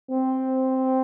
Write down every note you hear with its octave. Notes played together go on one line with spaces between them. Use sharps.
C4